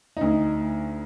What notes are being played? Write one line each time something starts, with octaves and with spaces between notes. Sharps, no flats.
D2 D#4